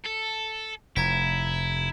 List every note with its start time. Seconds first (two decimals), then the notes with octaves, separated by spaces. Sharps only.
0.06 A4
0.96 F1 E4 A#5 G#6 B6